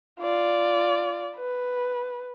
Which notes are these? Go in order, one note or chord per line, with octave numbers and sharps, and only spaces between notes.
F4 D5
B4